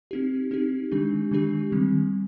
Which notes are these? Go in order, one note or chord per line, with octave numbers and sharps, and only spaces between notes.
C4 D#4 G4
C4 D#4 G4
D#3 G#3 D4 G4
D#3 G#3 D4 G4
D#3 G3 C4